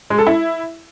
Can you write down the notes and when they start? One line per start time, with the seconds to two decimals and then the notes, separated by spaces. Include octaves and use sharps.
0.10 G#3
0.18 A4
0.27 E4